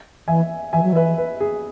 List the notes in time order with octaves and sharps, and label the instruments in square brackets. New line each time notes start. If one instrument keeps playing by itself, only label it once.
[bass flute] E3 [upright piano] E5 G#5
[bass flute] E3 [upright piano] E5 G#5
[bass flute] F#3
[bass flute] E3 [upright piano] B4 E5
[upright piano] B4
G#4